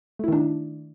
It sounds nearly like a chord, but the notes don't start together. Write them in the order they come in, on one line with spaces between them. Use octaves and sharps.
A3 E4 D#3 D4